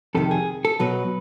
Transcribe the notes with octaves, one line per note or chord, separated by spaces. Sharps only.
F2 C3 D#3 A4
G#4
A4
B2 F#3 B4